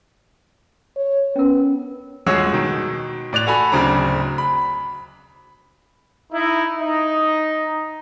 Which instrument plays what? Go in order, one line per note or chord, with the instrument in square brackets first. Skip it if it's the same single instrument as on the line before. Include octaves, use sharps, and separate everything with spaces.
[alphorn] C#5
[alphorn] B3 [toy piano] C#4 A#4
[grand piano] D#1 G#3 F#4 G#4 C#5 E6
B2 D#3
A2 D5 F#6 F7
F#4 A4 G#5 B5
D1 C#3 F#3 C4 D4 A#5
B5
[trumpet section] D#4 E4
D#4